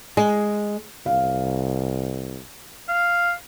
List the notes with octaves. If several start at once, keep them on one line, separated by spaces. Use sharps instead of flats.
G#3
C2 F5
F5